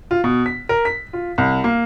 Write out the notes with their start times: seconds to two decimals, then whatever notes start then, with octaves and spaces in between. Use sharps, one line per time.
0.11 F4
0.24 B2
0.46 B6
0.69 A#4
0.85 B6
1.13 F4
1.38 C2
1.64 A#3